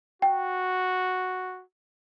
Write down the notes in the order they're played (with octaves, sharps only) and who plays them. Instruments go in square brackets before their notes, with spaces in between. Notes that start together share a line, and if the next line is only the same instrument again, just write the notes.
[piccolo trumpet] F#4 [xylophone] G5